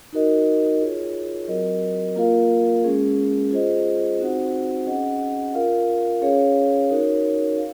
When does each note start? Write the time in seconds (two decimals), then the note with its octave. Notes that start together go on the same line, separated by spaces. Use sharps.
0.13 D#4 F#4 A#4 D#5
0.80 F4 G#4 C#5
1.48 F#3 C4 F#4 A#4 D#5
2.16 A#3 F4 A#4 F5
2.84 G#3 C#4 G#4
3.51 F4 G#4 C5 D#5
4.19 C4 D#4 F#4 C5 F#5
4.86 C#4 G#4 D#5 F#5
5.54 F4 A#4 F5
6.22 C#4 G#4 C#5 F5
6.89 D#4 F#4 A#4 C#5
7.58 F5